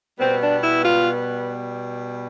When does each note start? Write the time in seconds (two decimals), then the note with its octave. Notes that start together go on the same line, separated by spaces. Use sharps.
0.18 B2 G3 B3 C4
0.41 D4
0.63 E4
0.84 F4